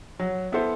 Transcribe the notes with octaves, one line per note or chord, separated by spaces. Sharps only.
F#3
B3 E4 A4 C5